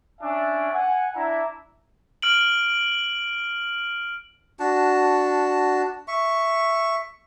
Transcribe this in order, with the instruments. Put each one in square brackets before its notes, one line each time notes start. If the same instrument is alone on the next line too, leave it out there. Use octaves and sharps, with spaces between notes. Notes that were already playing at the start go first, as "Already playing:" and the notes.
[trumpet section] C#4 D4 E5 G#5
F#5 G#5
D4 E4 E5 A#5
[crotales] F6 D7 F#7
[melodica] D4 F#4 A5
E5 C#6